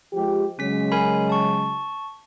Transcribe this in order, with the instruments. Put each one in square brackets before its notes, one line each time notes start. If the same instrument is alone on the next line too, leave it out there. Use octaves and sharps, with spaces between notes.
[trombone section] F3 G#3 G4
[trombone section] C#3 F#3 G#3 [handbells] C#4 B6
[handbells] A#4 G#5 B5
A5 C#6